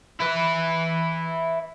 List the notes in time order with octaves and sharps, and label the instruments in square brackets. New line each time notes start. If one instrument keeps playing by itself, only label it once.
[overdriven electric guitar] E4 B4